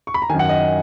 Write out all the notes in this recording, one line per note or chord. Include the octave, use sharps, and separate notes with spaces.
C#6
B5
A#5
F#2 D#3 G#5
F#5
D#5
D#5